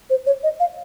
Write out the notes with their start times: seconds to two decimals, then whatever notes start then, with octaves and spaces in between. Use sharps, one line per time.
0.10 C5
0.26 C#5
0.43 D#5
0.60 F5